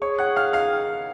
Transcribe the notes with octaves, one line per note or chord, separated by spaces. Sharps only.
G#4 C#5 C#6
F#5 F#6
F5 F6
F5 F6